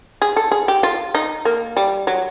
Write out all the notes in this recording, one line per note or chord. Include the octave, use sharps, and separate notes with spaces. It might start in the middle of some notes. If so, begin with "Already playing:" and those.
G#4
A4
G#4
G4
F4
D#4
A#3
G3
F#3